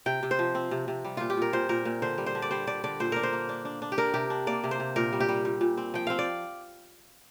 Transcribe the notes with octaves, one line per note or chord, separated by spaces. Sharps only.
C3 G5
C3
C5
F3
C4
C3
C3
G3
A#2 F4
G4
A#2 A#4
A#2 C5
A#2 A#4
A#2
D3 C5
G3
C5
D3
D5
G3 C5
D3 D5
D3 D5
A#2 C5
D4 A#4
C5
A#3
D4
D4
D4
G4
D4 A#4
C3 G4
D4
A#3 D5
C3
C5
C3
A#2 A#4
G3
G4
G3
A#2
A#2
C4
F3 G5
C4 F5
D5